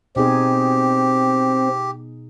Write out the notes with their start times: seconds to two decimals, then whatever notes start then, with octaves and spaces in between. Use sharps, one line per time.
0.16 B2 C4 D#4 G4 G#4